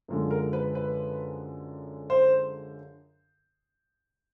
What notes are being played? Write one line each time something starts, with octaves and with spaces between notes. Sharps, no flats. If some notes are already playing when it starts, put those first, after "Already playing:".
F#2 D3 F3 G#3
A#4
B4
B4
C5